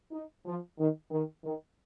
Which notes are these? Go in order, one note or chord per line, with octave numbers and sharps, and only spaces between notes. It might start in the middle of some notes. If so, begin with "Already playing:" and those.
D#4
F3
D#3
D#3
D#3